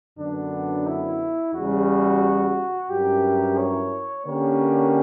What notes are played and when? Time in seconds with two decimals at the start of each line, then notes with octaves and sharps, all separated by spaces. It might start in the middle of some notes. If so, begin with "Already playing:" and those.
0.18 F#2 D3 F#3 B3 D4
0.87 E4
1.54 E2 C#3 G3 F#4
2.90 G2 F#3 C#4 E4 G4 A#4
3.58 C#5
4.26 D3 A#3 C#4 G4 A#4 C#5